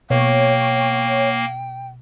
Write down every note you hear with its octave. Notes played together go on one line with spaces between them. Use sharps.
B2 A#3 C#5 G5